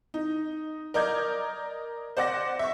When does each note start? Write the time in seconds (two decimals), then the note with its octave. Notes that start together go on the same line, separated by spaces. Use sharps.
0.14 D#4
0.94 A#4 D5 D#5 D6 G6 G#6
2.17 C5 D5 F#5 D6 A#6
2.59 E5 C#6